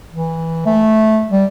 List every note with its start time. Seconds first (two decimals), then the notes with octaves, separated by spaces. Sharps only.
0.11 E3
0.66 A3
1.30 G3